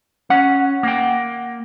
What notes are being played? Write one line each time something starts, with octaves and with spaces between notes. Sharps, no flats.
C#4 F#5
A#3 G5